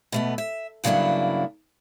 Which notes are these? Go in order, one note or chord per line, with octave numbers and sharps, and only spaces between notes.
B2 A3 B3
E5
G2 C#3 F#3 A#3 D4 E4